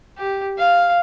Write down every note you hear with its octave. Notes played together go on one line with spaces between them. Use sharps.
G4
F5